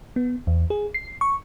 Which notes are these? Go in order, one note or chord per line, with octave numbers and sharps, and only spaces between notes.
B3
E2
G#4
C7
C#6